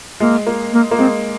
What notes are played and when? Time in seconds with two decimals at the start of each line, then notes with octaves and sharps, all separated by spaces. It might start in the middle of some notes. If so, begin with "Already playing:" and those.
0.20 G#3 A#3
0.47 A#3
0.73 A#3
0.91 A#3
0.99 G#3 C4